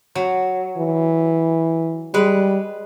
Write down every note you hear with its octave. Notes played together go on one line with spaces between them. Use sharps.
F#3
E3
G3 G#3 B4